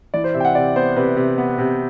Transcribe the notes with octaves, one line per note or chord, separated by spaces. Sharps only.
E3 D5
C5
C3 E5
G5
F#5
C3 D5
B3 C5
C3 B4
C3
B3
C3